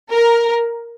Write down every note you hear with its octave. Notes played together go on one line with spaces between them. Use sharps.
A#4